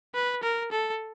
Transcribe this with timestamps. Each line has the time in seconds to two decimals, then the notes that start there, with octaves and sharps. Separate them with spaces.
0.15 B4
0.43 A#4
0.72 A4